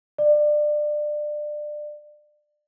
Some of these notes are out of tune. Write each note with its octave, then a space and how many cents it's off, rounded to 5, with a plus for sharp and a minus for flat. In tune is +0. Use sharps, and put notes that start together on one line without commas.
D5 +25